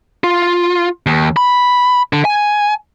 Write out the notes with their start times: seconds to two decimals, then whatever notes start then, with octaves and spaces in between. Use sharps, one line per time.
0.24 F4
1.06 D#2
1.37 B5
2.13 D3
2.25 G#5